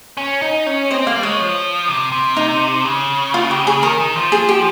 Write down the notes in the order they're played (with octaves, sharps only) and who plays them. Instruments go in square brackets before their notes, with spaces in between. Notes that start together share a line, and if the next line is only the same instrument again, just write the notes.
[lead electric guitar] C#4
D#4
C#4
[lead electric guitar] C4 [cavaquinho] D#5
[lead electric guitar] A#3 [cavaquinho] F5
[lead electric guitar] G3
[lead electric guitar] G#3 [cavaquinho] C#5
[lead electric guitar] F3
C3
C3
[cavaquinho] D#4
[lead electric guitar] C#3
[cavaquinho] F4
G4
G#4
[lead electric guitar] D#3 [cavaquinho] A#4
[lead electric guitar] D#3
F3
[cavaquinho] G#4
G4